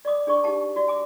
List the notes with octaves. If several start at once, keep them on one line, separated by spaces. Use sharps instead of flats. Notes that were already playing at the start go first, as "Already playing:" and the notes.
D5 D#5 D6 D#6
D4 G#4 D5 C#6 D6
D#4 G4 F#5 A5
F#4 D5 E5
G#5 D6